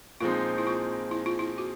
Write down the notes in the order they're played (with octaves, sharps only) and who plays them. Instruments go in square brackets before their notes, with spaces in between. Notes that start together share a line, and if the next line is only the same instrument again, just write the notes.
[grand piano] A#2 F3 G#3 C4 D#4 [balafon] F4
[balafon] E4
F4
E4
F4
E4
F#4